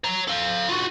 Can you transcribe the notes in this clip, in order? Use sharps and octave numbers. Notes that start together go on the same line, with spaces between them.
C#5 A#5
A4 F5
F4 F#4